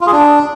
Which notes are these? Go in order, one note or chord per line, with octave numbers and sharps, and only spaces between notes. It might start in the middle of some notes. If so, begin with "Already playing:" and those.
F4
G#4
D4